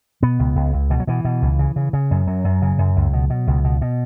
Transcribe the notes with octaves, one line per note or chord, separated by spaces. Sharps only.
B2 B3
C#2
C#2
C#2
B2 E3
F#3
B2 E3
B2
C#2
C#3
C#3
C#3
F#2
F#2 F#3
F#2
C#3
F#2
C#2
B2
B2
C#2
B2
B2